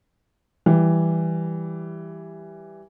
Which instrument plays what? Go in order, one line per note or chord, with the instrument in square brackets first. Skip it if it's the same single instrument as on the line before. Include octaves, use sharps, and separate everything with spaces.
[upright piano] E3 G3 G4